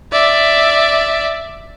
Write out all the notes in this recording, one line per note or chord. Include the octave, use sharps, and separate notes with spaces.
D5 E5